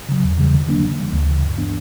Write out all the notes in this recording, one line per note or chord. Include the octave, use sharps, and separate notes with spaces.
C#3 F#3
E2
C#3 E3 G3
D3
F#3 A#3 D4
C#3
E3 G3
D2
C#3 E3
G2
E3 B3 D4